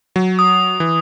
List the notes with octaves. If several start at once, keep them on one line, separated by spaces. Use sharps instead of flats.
F#3
D#6
E3